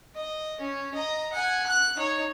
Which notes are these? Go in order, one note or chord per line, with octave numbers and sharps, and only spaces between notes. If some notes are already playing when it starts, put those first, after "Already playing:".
D#5
C#4
D#5 A#5
F#5 G#5
F#6
D#4 C#5